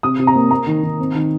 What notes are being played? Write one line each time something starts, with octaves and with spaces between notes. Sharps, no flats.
C3 D#6
C3
A#5
A#3
A#3 A#5
D#3
D#3
C4
D#3